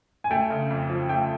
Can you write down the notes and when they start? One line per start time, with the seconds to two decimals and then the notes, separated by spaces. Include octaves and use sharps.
0.24 G#5
0.31 A3 G5
0.50 C#3
0.70 F2
0.90 F3
1.09 A3 G5